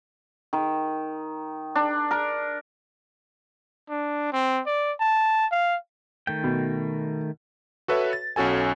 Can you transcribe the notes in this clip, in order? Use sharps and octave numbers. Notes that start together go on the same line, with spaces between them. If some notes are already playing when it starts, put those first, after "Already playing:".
D#3
D4
A#4
D4
C4
D5
A5
F5
D#3 A3 G5
B2
F#4 A4 B4 C#5 E5
A6
B1 C#4 F#4 A4 G#5